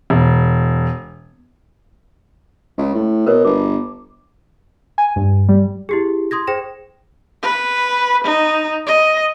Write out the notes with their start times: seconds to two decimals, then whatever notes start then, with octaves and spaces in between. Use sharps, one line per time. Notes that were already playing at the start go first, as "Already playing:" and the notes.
0.10 E1
2.78 C#2
2.94 A2
3.26 B2 A#4 B4 C#5
3.45 G1 D6
4.98 G#5
5.16 G2
5.49 G3
5.89 E4 G4 G#4
6.31 C6 D#6 G#6 A#6
6.47 G#4 C5 G5 A#6 E7
7.43 B4
8.24 D#4
8.87 D#5